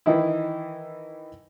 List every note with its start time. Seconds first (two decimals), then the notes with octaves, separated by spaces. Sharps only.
0.06 D#3 E3 D#4 E4